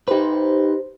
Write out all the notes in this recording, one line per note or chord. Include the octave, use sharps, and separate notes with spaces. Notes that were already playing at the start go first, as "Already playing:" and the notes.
D#4 G4 B4 C5